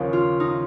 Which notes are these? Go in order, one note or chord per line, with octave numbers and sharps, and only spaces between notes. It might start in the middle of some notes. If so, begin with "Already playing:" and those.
Already playing: D#2 C#3 F3 A#3 C#4
F4
D#4